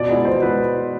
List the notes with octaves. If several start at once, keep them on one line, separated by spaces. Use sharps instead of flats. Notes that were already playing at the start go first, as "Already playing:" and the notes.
Already playing: B2 D5
G#3 B3 E4
B2 C5
G#3 B3 E4 B4